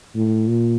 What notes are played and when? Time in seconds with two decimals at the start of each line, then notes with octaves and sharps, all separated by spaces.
0.16 A2
0.48 A#2